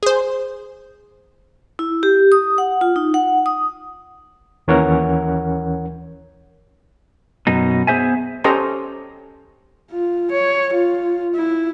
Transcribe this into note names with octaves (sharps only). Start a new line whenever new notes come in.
G#4 C5
E4
G4
D#6
F#5
F4
D#4
F#5
D#6
D#2 E3 C#4 A#4 C#5 F#5
F#2 B2 D#4
B3 G#4 C5 E5 G#5
C#4 G4 A4 C5 D#5 A#5
F4
C#5
F4
E4